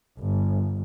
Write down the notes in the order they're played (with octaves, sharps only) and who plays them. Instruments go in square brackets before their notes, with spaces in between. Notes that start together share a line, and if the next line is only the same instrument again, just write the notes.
[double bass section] G1